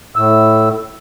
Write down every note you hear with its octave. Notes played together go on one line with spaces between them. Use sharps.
A2 E6